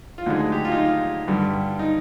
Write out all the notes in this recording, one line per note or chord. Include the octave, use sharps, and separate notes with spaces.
F4
D2 D3 G#3 D#4
G4
F4
D#4
F4
G2 D3 G3
D#4